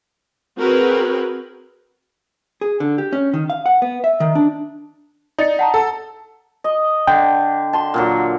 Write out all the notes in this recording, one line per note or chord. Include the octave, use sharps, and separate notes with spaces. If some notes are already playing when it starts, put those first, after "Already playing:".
C4 F#4 G#4 A#4 B4
G#4
D3
G4
C#4
D#3
F5
F#5
B3
E5
D#3
D4
D#4 D5 A6 C#7
F#5 A5 A#5
A4
D#5
D3 G5
A5 C6
A#2 D3 F#3